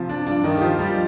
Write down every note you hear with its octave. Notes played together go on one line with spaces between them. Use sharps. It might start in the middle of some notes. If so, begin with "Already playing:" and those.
Already playing: C3 F3
D4
G2 D4
D#3 D#4
G4
F3 F4
G3 G4